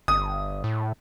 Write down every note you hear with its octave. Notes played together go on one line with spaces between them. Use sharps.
G1 D#6
A2